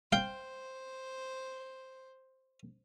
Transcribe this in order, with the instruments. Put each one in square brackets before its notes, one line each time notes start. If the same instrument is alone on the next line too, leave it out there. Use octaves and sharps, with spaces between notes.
[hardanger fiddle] C5 [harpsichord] F5 [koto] G5